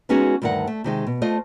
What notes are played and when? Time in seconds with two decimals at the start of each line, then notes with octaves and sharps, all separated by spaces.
0.09 G#3 B3 C#4 D#4 F#4 G#4
0.42 D2 G2 D#3 A#4 F#5
0.67 A3
0.84 C3 D#3 G#3
1.07 B2
1.22 A3 F4 C5 D#5